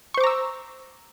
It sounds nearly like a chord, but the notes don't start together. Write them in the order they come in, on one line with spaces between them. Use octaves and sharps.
C#6 C5 D6 A#5 E6